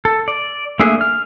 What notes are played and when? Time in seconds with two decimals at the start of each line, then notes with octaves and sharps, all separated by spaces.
0.05 A4
0.28 D5
0.80 A3 A#3 D4 G#4 E5
1.01 F6